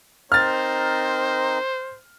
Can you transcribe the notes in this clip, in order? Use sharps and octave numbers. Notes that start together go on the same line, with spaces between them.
C4 D#4 A#4 C5 F6 A6